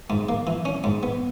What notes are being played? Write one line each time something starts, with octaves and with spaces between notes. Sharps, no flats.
G#2
A#3
E3
C#4
G#2
B3